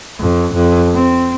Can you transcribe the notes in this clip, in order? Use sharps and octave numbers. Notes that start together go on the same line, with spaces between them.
F2
F2
C4